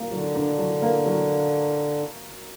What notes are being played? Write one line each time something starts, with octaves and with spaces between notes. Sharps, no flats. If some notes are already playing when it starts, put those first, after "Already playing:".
Already playing: F#3 A#3
D3 F#3
D4
F#3
A#3
F#3